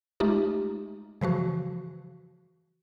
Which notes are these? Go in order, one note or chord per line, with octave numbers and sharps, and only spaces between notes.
G#3 A3 D#4 F4 G4
C#3 E3 F3 F#4